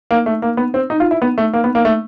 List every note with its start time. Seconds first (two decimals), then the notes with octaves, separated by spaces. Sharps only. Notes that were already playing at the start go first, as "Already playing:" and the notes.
0.11 A#3
0.26 A3
0.42 A#3
0.57 B3
0.74 C4
0.90 D#4
1.00 F4
1.11 E4
1.22 B3
1.38 A3
1.53 A#3
1.64 B3
1.75 A#3
1.85 A3